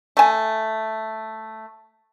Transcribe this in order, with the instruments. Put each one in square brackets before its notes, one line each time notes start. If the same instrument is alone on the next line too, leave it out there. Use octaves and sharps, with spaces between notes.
[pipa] A3 G#5